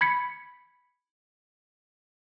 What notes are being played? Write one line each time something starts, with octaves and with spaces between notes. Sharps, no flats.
B5 G#6 B6 C#7